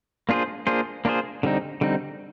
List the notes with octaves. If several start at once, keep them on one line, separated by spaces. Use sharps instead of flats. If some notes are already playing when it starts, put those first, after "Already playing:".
A#3 D4 F4 G#4 C5
A#3 D4 F4 G#4 C5
A#3 D4 F4 G#4 C5
D3 G3 C4 D#4
D3 G3 C4 D#4